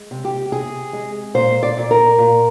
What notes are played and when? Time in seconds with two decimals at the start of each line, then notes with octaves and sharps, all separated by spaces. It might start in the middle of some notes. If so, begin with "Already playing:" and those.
Already playing: G#3
0.11 C3
0.25 G4
0.52 C3 G#4
0.93 G#3
1.34 A#2 C5
1.63 D5
1.77 A#2
1.91 A#4
2.18 A#2